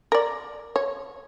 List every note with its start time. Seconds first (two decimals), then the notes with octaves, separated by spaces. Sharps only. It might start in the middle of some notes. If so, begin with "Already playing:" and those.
0.12 A#4 D5
0.76 C#5